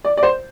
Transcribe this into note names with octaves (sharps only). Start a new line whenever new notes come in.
D5
D5
C5